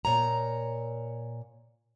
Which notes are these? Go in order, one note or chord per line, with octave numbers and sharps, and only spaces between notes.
A#2 C#5 A#5